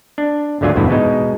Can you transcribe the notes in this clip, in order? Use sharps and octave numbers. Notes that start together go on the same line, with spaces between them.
D4
G#1 D2 D3 F#3 F4 G#5
A1 E2 G2 C3 E4
B2 G#3 D#4